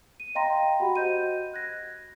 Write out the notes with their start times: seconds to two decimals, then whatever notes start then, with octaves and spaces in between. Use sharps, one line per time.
0.20 D#7
0.35 D#5 F5 G5 A#5 C6 A#6
0.80 F#4 G4 F#5 B5
0.95 F#4 C5 D#5 G6 D#7
1.54 F#6 G#6 A#6